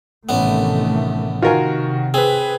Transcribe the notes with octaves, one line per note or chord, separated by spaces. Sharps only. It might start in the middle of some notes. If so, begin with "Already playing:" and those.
A1 C3 D#3 A3 B3
C3 D#3 F4 F#4 A#4 G#5
C4 G#4 B4